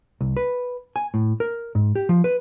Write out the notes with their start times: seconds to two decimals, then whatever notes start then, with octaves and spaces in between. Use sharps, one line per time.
0.21 C2
0.37 B4
0.96 G#5
1.14 A2
1.40 A#4
1.75 G#2
1.96 G4
2.09 F3
2.24 B4